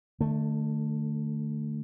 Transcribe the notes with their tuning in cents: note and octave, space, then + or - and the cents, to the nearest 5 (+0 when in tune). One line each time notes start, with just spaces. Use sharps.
D3 +40 A3 +5